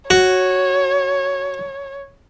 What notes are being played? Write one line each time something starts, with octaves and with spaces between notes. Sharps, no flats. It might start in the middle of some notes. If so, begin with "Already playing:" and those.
F#4 C#5